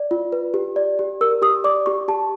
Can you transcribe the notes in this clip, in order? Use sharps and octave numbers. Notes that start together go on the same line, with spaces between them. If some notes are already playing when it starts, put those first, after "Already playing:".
Already playing: D5
F4
B4
G4
D5
G4
A#4 E6
G4 D#6
D5 D6
G4 C#6
G4 A5